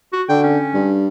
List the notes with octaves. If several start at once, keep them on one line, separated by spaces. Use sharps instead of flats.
F#4
D3 G5
C#4
G2